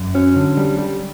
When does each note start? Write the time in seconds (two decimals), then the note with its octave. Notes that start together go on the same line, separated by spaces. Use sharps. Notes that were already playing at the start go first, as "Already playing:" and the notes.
Already playing: F#2
0.14 F#3 C#4
0.36 D3
0.57 G3
0.79 G3